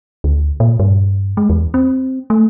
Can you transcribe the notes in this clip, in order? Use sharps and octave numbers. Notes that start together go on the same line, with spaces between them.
D2
A#2
G2
G#3
E2
C4
A3